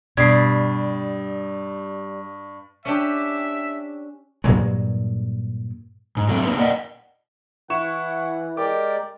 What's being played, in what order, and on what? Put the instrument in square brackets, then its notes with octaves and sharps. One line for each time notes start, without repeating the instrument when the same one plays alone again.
[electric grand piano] G2 D#6 [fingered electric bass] B2 [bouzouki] G3 [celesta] G#6 C7
[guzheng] C#4 D4 G4 [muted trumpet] E5
[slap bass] G2 A#2 F#3 G#3
[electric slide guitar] G#2
F#3 A3 C4
A#3 D#4 B4
D5 D#5 F#5
[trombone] E3 [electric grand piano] E4 C#6 E7 [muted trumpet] F#5
[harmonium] G#3 A#4 D5 [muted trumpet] G4 [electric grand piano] D6